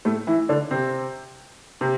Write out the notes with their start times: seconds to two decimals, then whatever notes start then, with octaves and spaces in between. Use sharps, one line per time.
0.05 A2 A3
0.27 E3 E4
0.49 D3 D4
0.71 C3 C4
1.81 C3 C4